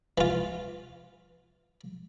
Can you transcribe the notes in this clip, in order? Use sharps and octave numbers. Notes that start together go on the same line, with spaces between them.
E3 F4